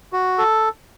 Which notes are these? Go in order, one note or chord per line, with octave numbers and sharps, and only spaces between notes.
F#4
A4